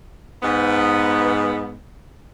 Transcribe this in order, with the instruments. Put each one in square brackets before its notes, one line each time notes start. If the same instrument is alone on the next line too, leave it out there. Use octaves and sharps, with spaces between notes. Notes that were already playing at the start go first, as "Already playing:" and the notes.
[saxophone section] G#2 B3